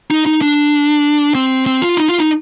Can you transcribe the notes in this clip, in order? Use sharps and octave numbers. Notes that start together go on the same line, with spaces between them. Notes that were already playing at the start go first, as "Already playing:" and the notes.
D#4
D#4
D4
C4
C4
F4
D#4
F4
D#4